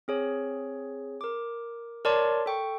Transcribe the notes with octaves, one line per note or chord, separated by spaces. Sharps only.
C4 G#4 C#5
A#4 D6
A#4 C#5 D5 A5 C6 D6
A4 G5 C#6